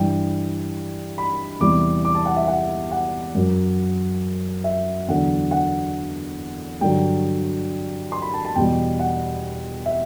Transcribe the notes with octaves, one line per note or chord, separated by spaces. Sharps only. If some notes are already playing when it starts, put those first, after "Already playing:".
Already playing: G2 E3 G3 G5
B5
E2 C3 E3 G3 D6
D6
A5
F#5
E5
F#5
F#5
F#2 F#3
E5
E2 D3 F#3 F#5
F#5
G2 D3 F#3 G5
C6
B5
A5
A5
E2 B2 G3 G5
F#5
E5